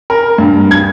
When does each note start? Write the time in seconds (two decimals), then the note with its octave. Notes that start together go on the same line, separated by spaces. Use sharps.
0.10 A#4
0.38 G2
0.71 G#6